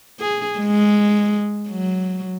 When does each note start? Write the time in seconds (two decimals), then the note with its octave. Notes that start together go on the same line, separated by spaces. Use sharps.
0.20 G#4
0.59 G#3
1.69 F#3